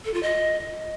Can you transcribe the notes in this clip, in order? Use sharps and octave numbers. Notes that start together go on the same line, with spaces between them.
A4
F4
D#5